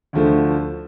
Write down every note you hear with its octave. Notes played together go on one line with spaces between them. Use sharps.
D2 D3 F3 A3